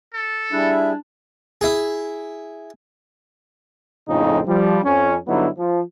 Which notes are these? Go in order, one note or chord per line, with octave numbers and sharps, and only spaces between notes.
A4
G3 D4 E4 G#4 E5
E4 G#4
A#1 F2 A2 C#3 C4 D#4
F3 G3
F2 C#4
G2 D3 F#3 B3 D#4 E4
F3